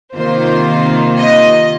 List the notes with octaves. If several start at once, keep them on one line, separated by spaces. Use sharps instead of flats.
C3 D#3 A#3 F4 C5
D#5